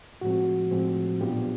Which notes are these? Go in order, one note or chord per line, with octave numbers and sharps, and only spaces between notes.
A2 F3 G#3 C4 F#4
A2 F3 G#3 C4
A#2 F#3 B3 D4 F4 G4